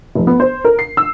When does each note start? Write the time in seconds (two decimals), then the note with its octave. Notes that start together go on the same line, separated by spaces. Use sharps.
0.15 F1
0.27 B3
0.40 C5
0.65 A#4
0.79 C7
0.97 E6